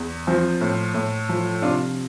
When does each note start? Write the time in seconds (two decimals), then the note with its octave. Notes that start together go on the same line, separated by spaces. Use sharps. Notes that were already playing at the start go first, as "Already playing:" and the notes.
Already playing: E2
0.27 F3 C4
0.61 A2
0.94 A2
1.29 F3
1.62 C3 D4 F4